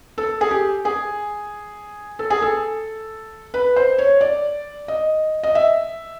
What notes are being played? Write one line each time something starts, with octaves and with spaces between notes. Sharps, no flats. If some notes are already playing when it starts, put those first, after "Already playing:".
A4
G#4
G4
G#4
A4
G#4
A4
B4
C5
C#5
D5
D#5
D#5
E5